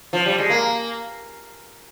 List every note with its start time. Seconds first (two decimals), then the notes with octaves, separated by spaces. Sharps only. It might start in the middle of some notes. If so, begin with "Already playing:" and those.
0.13 F3
0.26 G3
0.38 G#3
0.50 A#3